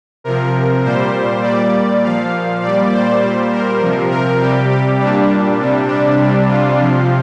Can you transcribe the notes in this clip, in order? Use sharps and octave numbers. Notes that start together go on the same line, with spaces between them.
C3 F3 A#4
A#2 G3 C5
A#2 G3 D5
A#2 F3 F5
A#2 G3 D5
C5
A#2 G3
A#4
C3 F3
A#4
C3 G3 G4
G4
A#2 G3 D4
C3 G3
D4
C3 G3
F4
C3 F3